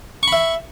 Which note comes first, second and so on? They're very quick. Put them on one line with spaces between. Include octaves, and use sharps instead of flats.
C#6 B5 E5